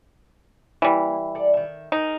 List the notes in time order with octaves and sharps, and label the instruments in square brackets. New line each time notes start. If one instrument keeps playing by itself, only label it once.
[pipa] E3 G3 [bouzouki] A#3 F5
[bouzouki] A4 D5
D#3 E5
[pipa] D#4 [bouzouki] G#4 A#4